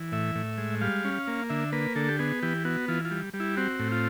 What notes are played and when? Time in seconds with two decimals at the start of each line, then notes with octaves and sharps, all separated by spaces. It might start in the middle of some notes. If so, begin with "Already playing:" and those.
Already playing: E3
0.12 A2 E5
0.35 A2
0.58 G#3
0.81 G3 F5
1.05 C#4
1.28 A#3
1.50 D3 E5
1.73 A#3 B4
1.96 D3 A4
2.09 G4
2.19 B3 G#4
2.43 E3 G4
2.65 B3 F#4
2.88 E3 F4
3.05 F4
3.11 G3
3.34 G3
3.40 E4
3.57 C4 F#4
3.80 A2
3.92 F4